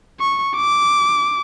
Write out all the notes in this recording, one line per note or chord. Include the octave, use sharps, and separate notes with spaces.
C#6
D6